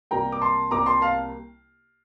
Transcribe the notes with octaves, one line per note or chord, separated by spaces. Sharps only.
C2 C3 G3 A#3 G5 A#5
D6
A5 C6
C2 C3 G3 A#3 A#5 D6
A5 C6
F5 A5